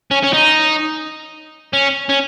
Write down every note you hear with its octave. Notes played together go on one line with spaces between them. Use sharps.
C#4
C#4
D#4
C#4
C#4